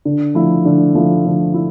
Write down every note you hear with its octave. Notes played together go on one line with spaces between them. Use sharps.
D3
F3 A3 E4
D3
F3 A3 E4
D3
E4